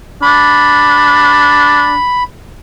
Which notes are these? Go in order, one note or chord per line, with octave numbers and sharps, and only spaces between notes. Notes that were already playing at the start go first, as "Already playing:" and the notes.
D4 B5